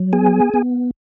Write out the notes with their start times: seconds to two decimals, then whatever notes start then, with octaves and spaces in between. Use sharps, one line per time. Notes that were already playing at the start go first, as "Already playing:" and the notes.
Already playing: F#3
0.13 B3 G#4 G#5
0.54 B3